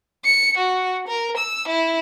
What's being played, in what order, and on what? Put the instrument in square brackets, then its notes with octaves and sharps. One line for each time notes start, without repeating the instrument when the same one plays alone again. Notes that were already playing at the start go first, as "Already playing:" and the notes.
[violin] C#7
F#4
A#4
E6
E4